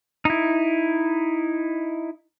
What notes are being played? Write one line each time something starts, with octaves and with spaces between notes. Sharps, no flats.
D#4 E4